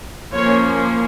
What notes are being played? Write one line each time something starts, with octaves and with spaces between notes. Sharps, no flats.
F3 A#3 C#4 C#5